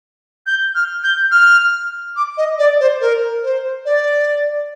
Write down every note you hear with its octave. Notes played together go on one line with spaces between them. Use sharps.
G6
F6
G6
F6
D6
D#5
D5
C5
A#4
C5
D5